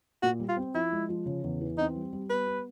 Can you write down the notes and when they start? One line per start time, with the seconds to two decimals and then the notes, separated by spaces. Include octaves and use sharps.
0.23 A#2 F#4
0.40 G3
0.49 F4
0.57 C4
0.75 F3 E4
0.92 G#3
1.09 F3
1.26 C#3
1.44 E2
1.61 E3
1.78 C4 D#4
1.96 G3
2.13 G3
2.30 B3 B4
2.47 B3